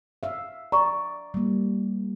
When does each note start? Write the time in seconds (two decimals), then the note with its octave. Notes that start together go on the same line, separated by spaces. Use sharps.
0.23 E5 F5
0.72 D5 A#5 C#6
1.34 G3 A#3